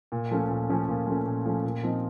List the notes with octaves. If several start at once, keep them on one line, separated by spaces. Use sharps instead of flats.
A#2
F3 A3 C#4
A#2
F3 A3 C#4
A#2
F3 A3 C#4
A#2
F3 A3 C#4
A#2
F3 C4 D#4